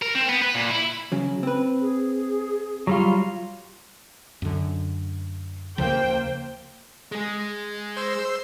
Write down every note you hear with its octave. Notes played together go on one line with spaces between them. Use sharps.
A#4
C4
B3
B4
A#2
E4
C#3 F#3
C4 B4
G#4
F#3 G3 F4
F#2 D3
D#2 C#3 F3 A#3 C5 G5
G#3 G#4
C5 C6 E6